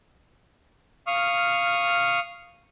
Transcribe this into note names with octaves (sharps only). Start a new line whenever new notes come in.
F5 C#6 D#6 F6